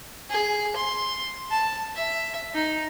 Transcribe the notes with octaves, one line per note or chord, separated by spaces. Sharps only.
G#4
C6
A5
E5
D#4